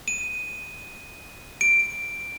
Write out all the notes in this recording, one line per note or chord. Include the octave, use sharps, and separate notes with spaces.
D#7
D7